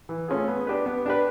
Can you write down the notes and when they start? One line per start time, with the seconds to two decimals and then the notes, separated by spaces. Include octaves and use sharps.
0.09 E3
0.28 A3 C#4 F4 G#4
0.48 B3
0.67 D4 G4 B4
0.86 B3
1.06 D4 G4 B4